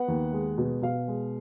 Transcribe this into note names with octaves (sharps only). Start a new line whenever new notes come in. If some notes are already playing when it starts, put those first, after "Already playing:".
Already playing: B3 F#5
D#2
G#3
B2
B2 F5
G#3